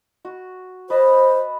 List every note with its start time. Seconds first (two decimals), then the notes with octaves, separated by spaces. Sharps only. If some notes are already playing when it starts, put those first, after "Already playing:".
0.25 F#4
0.90 B4 C5 D#5 A5